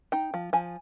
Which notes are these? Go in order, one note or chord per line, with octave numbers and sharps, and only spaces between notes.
D#4 G5
F3
F3 G#5